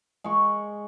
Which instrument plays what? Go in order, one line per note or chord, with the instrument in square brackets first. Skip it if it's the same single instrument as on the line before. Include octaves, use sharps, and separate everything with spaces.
[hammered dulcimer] G#3 C#6